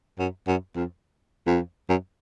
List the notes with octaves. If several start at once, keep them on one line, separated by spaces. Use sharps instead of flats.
F#2
F#2
F2
F2
F#2